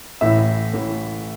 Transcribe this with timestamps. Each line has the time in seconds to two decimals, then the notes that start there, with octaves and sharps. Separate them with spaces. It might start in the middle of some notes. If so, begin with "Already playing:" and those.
0.21 A1 A2 E3 E5
0.73 A1 A2 E3